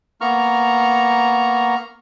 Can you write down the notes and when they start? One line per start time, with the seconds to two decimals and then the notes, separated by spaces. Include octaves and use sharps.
0.21 A#3 B3 A#5 C#6 F6